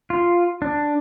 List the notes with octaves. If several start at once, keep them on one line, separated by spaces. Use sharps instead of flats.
F4
D4